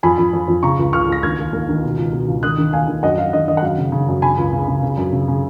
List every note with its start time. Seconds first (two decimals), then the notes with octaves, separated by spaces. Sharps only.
0.03 F2 G#5 B5
0.18 F2
0.33 F2
0.48 F2
0.63 C#3 A#5 C#6
0.79 C#2
0.93 C#2 C#6 F6
1.08 C#2 A#6
1.23 D#2 F6 G#6
1.38 D#2
1.53 D#2
1.69 D#3
1.83 B2
1.97 C#2
2.13 B2
2.28 C#2
2.43 D#3 D#6 F#6
2.58 D#3
2.73 D#2 F5 G#5
2.87 D#3
3.03 F#2 D#5 F#5
3.17 F#2 F5
3.33 D#3 D#5
3.48 D#3 D#5
3.57 F#5
3.62 F#2 F5
3.78 C#3
3.92 C#3
4.08 F#2
4.22 C#3 G#5 B5
4.38 C#2
4.53 C#3
4.68 C#3
4.83 C#3
4.97 F#2
5.13 C#3
5.28 C#3